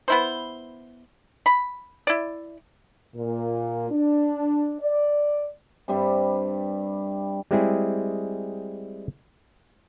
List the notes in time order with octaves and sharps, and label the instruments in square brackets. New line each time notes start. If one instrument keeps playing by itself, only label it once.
[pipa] B3 E4 C5
B5
E4 D5
[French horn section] A#2
D4
D5
[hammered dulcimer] G2 C3 G3
[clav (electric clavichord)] G3 G#3 C4 E4 G#4